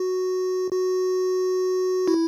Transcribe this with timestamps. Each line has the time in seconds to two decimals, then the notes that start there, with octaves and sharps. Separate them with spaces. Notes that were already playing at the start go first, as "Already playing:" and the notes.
Already playing: F#4
0.72 F#4
2.08 E4